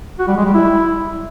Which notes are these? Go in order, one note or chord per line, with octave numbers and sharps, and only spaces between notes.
F#4
G3
G#3
G3
E4